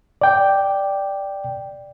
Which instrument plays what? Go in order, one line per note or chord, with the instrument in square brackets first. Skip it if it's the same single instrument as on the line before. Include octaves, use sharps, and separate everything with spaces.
[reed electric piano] D5 G5